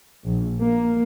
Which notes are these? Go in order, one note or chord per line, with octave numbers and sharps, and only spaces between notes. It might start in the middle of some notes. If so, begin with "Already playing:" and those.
A#1
A#3